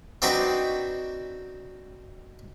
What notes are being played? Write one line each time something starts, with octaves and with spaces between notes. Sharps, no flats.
C4 D4 D#4 F#4 B4 G5